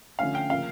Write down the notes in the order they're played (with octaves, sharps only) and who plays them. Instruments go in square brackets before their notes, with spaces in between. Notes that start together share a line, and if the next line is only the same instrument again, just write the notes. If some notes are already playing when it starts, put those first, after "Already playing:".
[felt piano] D3 F3 A3 C#4 [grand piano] F5
[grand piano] G5
[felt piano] C#3 F3 A#3 [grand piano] F5